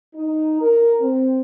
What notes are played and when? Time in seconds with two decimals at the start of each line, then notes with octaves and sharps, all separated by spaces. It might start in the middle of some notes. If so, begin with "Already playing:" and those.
0.15 D#4
0.61 A#4
1.01 C4